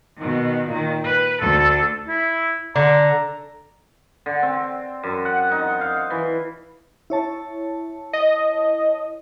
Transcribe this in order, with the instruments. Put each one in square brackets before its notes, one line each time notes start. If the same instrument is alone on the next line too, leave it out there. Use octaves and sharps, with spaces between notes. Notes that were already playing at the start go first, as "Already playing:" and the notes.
[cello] B2 D#3
A#2 D#3
B4
D2 A4
[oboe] E4
[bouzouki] D3 [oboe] A#5
[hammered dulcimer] D3
C4
F#2
F#5
D#4
F5
E3
[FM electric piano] E4 C#5 A5
[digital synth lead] D#5